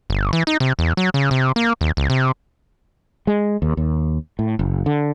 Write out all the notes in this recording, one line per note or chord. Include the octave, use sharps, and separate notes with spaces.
G1
E3
D#4
C3
E2
F#3
C#3
C3
A#3
D#2
C#2
C3
G#3
D#2
D#2
A2
F#1
D3